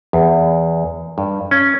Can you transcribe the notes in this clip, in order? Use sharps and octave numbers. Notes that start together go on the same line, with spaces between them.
E2
G2
C#4